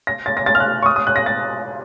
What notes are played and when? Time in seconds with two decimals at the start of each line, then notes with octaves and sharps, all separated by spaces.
0.07 A#6
0.26 A6
0.37 A#6
0.46 A6
0.55 F6
0.60 F#6
0.83 C#6
0.86 D#6
0.96 D#6
1.07 F#6
1.16 A#6
1.26 A6